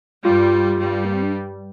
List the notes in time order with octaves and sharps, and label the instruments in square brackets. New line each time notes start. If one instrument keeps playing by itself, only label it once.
[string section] G2 G3 [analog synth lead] F4
[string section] G2 G3
[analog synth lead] A#3
C4
D4